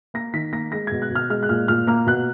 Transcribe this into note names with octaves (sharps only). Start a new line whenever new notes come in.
A#3 A#6
D#3 B6
A#3 A#6
G#3 A#6
B2 G#6
F#6
B2
F6
G#3 F6
F#6
A#2 F6
A#2 F6
A#3 F6
B2 F#6